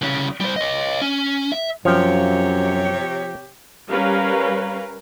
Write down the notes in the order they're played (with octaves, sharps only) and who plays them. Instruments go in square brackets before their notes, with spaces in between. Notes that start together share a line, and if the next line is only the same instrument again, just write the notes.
[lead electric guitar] C2 C#3
G3 C5
C#5 D#5
C#4
E5
[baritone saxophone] F#2 [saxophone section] C3 G4 C#5 [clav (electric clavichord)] F3
[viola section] G3 C#4 A#4 B4 F5